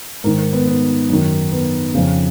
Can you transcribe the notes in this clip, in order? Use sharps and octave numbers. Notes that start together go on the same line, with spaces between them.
G#2 D#3 A#4
A#4
B3
B3
F#2 D#3
B3
F2 C#3